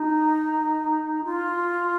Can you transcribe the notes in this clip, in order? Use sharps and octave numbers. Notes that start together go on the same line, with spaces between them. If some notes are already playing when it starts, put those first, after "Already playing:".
Already playing: D#4
F4